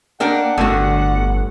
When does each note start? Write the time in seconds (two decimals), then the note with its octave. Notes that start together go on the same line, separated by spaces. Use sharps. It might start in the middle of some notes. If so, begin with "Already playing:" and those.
0.20 A#3 D4 A#4 F#5 G5
0.58 G1 A2 D3 F#4 D#6